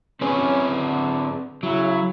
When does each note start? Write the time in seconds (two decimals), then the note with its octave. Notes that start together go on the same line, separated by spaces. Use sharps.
0.21 C4 C#4 G#4 B4
0.69 D3
1.63 C#3 F#3 E4